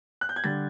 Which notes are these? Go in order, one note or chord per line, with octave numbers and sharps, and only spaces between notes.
F#6
G6
G#6
D3 G3 A6